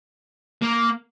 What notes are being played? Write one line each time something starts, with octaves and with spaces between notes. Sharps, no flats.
A#3